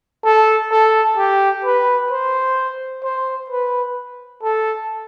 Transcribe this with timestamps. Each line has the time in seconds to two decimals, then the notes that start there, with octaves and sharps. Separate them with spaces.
0.24 A4
0.71 A4
1.17 G4
1.64 B4
2.11 C5
3.03 C5
3.50 B4
4.43 A4